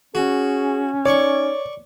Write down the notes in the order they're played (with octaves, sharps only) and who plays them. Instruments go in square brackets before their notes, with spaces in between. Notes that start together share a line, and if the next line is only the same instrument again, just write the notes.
[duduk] C#4 [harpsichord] F#4 [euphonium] G#4
[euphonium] D#4 [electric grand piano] C#5 [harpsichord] D5 C#6